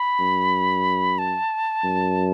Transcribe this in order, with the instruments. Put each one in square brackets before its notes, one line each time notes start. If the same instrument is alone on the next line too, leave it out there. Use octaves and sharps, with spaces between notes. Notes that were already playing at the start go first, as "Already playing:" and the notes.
Already playing: [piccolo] B5
[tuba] F#2
[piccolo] A5
[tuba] F#2